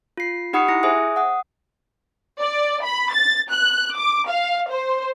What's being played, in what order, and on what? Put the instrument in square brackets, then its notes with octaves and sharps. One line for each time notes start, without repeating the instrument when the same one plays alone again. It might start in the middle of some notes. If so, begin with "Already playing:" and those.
[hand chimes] F4 C7
D#4 G4 F#5 B5 D#6 C#7
E4 A#6 C#7
G#4 C5 E5 G#5 D#6
F#5 D#6
[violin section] D5
B5
A6
F#6
D6
F5
C5